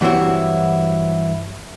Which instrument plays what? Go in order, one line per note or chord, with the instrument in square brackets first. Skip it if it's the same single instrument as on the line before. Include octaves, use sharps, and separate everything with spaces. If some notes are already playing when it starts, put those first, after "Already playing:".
[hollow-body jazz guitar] G2 E3 F#3 C4 E4 F#4